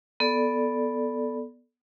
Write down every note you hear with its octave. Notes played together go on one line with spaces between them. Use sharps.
B3 A4 D5